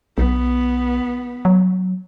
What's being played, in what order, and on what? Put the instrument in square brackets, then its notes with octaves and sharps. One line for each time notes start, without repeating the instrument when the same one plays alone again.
[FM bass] B1 [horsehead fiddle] B3
[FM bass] F#3